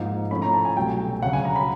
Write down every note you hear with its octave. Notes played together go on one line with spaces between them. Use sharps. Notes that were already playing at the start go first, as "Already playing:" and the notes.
Already playing: G#2 F3 A#3 D#4
A2 F3 A3 C#4 B5
A#5
A5
G#5
C2 B2 F#3 A3 G5
D2 C#3 F#3 F#5
G#5
A#5
B5